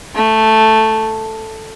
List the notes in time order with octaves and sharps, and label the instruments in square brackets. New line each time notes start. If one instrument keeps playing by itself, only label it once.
[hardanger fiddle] A3